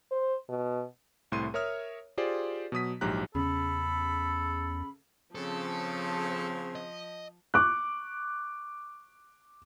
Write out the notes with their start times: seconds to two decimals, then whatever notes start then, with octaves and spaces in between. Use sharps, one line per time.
0.11 C5
0.49 B2
1.32 C2 A2 C4 C6 D#7
1.54 A#4 C#5 E5 D#6 F6
2.17 F4 G4 G#4 C5 D5
2.72 B2 F#3 D#6 B6
3.01 A#1 G#2 F#3 G4 A#5 F#6
3.35 E2 C#3 A4 B5
5.35 C#3 F3 C4 A4
6.75 D#5
7.54 C#6 D6 F#6